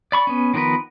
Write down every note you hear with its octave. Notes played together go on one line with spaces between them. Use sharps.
D5 B5 C#6
B3 C#4
D#3 F3 B3 A#4 B4